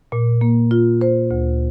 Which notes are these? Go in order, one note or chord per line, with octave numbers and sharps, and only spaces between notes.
A#2
A#3
F4
C5
D2